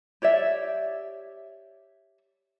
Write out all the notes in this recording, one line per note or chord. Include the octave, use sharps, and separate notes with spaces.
G4 C#5 D5 E5